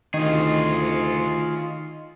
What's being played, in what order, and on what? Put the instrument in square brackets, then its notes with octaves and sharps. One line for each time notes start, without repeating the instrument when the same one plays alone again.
[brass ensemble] D2 C3 [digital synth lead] D#3 [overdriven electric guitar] F4 G#4